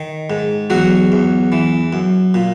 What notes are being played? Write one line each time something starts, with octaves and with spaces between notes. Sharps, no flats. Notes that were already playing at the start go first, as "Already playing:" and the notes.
Already playing: D#3
G#2
E2 F#3 F#4
E2
E3
F#2
A#2